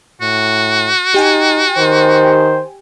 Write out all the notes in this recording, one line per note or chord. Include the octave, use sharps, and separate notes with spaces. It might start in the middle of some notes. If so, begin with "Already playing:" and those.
A2 F#4
D#4 G4 G5 G#5
D#3 C5